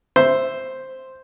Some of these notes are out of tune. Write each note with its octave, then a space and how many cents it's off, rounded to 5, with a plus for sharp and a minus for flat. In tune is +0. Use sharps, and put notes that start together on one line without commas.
C5 +0 E5 +0 C6 +0